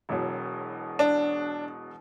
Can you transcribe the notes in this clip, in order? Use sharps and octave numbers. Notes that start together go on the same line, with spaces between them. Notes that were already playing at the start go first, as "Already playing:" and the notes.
E1 E2 B2 F#3
D4